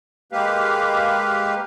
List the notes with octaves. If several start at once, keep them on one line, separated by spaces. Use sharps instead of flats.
G#3 A#3 G4 B4 F5